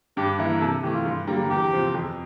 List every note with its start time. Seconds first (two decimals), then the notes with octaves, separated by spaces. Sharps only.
0.17 G2 G4
0.39 E3 A#3 E4
0.61 C3 A4
0.83 E3 G4
0.86 A3
0.94 F4
1.05 G2
1.27 D3 G3 A#3
1.50 E2 G4
1.72 C3 F3 C4 F4
1.94 F2